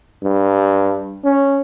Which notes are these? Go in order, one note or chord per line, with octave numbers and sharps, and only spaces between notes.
G2
C#4